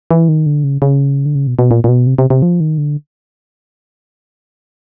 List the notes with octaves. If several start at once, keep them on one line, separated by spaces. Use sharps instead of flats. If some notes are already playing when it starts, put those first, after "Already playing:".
E3
D#3
D3
C#3
C#3
D3
C#3
B2
B2
A#2
A#2
B2
C3
C3
C3
F3
D#3
D3